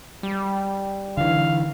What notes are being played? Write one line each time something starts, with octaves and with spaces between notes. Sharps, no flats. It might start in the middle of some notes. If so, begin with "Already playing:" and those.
G3
D3 E3 F5